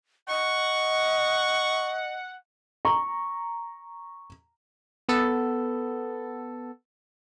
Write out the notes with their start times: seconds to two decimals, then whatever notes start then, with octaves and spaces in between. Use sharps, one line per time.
0.29 D#5 F#5 C#6
2.85 A#5 C#6
5.09 B3 A4